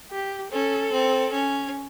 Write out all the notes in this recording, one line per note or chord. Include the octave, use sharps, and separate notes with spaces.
G4
C#4 A4
C4
C#4